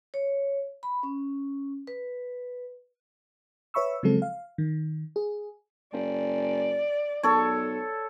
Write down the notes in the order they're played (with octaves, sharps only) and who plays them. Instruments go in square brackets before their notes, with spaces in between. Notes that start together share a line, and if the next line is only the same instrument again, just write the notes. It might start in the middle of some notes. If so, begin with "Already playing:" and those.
[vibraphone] C#5
B5
C#4
B4
[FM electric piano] B4 C#5 E5 B5 C#6 E6
C#3 F3 F#3 G#3 C4 A4
F5
D#3
G#4
[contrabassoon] F#1 [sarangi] D5
[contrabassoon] B1 [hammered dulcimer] A4 C#5